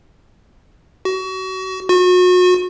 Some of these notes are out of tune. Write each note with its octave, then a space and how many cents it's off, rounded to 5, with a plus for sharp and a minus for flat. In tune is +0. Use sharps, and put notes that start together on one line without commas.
F#4 +30
F#4 -35